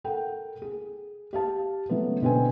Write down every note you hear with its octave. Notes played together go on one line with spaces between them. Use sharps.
A4 A#4 F#5 G5
G#4
G4 F5 A5
C#3 F#3 A3 B3
B2 D3 C4 B4 G#5